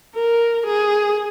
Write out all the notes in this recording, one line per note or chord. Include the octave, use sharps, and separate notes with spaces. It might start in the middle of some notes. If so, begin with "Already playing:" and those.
A#4
G#4